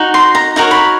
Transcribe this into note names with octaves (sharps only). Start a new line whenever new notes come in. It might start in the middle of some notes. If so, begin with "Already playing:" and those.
Already playing: D#4 F#4
C6
A#5
D#4 F#4 A#4 C#5 A#5
B5